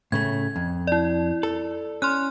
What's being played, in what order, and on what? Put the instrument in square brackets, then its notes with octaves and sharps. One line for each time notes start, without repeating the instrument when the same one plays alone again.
[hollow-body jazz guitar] A2 C#3 A3 [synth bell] G#6
[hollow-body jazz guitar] F2
[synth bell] E4 D5
[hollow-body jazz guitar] A4
[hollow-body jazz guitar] C#4 [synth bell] C6 F6 F#6